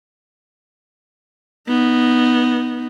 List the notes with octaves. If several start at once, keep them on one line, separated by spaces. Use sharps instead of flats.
B3 D#4